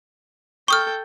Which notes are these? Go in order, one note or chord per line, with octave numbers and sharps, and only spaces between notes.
A4 G5 C#6 D#6 F6